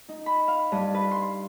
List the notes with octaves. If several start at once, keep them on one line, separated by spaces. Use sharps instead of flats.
D#4
B5
F5
G2
B4
C6